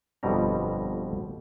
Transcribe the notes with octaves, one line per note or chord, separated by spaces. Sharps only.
G1 F2 B2 G3 A#5